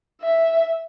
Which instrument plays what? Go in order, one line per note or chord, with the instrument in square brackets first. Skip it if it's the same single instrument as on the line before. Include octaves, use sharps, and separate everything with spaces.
[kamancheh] E5